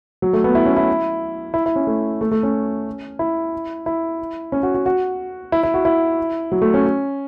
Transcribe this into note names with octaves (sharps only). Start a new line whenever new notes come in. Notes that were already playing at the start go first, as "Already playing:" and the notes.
F#3
A3
B3
E4
C#4
E4
E4
E4
C#4
A3
A3
A3
C#4
E4
E4
C#4
F#4
F#4
F#4
E4
E4
F#4
E4
F#3
A3
C#4